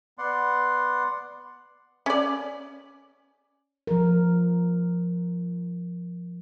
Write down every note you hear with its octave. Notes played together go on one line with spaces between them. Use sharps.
B3 D5 F#5 C6
C#4 D5
F3 A#4